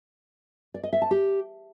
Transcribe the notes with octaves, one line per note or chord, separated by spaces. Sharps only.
D5
D#5
E5
A5
G4